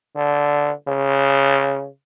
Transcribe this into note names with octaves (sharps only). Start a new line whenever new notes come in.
D3
C#3